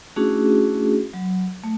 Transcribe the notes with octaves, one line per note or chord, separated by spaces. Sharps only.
A3 C#4 D4 E4 F#4 G#4
F#3
A3